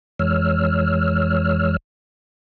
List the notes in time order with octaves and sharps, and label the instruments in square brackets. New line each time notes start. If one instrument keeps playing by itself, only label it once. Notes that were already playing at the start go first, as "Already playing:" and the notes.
[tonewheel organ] F2 E3 G#3 C#5 E6 F6